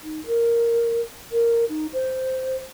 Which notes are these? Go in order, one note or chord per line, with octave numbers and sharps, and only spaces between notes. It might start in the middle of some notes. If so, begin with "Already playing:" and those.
D#4
A#4
A#4
D#4
C5